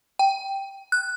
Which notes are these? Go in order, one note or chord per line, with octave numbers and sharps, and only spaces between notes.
G5
F#6